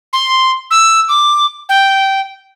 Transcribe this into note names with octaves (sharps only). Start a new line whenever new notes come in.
C6
E6
D6
G5